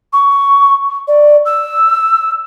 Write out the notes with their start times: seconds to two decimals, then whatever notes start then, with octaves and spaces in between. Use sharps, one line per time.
0.13 C#6
1.08 D5
1.45 E6